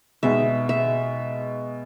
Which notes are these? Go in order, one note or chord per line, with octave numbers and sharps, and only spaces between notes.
B2 G#3 D#4 E5
E5